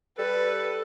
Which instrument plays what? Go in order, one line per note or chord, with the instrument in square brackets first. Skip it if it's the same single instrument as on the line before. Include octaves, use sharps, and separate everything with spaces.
[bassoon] G3 [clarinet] A4 [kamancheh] B4